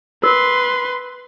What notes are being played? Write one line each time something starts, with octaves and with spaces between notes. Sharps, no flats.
A#4 B4 C6